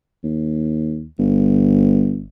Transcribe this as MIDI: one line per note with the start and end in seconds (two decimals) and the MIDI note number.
0.23 1.06 39
1.19 2.24 31